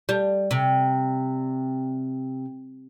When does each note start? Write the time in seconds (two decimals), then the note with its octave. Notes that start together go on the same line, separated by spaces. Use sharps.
0.09 G3
0.51 C3